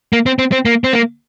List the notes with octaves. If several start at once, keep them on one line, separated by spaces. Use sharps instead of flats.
A#3
C4
C4
C4
A#3
C4
A#3